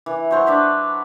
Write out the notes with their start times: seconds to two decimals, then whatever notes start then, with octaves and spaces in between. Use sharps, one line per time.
0.06 E3
0.31 F#3 C5 C#6
0.46 D4 B4 C#5